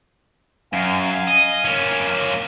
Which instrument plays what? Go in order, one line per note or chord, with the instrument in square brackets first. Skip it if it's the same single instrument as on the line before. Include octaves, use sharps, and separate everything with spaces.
[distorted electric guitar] F#2 [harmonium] F5 G#5
[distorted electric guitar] D#5
A#3 C#4